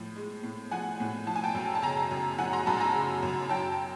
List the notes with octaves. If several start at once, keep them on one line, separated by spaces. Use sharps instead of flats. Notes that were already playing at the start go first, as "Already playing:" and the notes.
Already playing: A2 F3
G#3
A2
F3 F#5 G#5
A2
F3 A5
G#5
G5 A5
F#2
A5
C#3 G#5 A#5
F#2
F3 F#5 G#5
A#5 C6
F#2 A5 B5
G#5 A#5
C#3
F#2
F#3 G5 A5